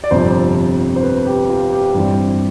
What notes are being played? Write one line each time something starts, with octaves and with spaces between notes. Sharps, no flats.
D5
G1 F2 C3 F3 C5
C5
B4
G4
F4
G4
G2 E3 G3 C4